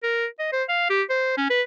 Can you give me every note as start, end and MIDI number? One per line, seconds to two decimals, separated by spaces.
0.03 0.26 70
0.39 0.51 75
0.53 0.64 72
0.69 0.90 77
0.90 1.03 67
1.10 1.36 72
1.38 1.49 61
1.50 1.62 71